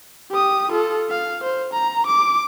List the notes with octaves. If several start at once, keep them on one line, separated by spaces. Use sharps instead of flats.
G4 D#6
F4 A4
F5
C5
A#5
D6